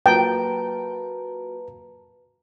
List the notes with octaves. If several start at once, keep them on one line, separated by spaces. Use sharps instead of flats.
F#3 A#3 F4 B4 G5 A5 A#5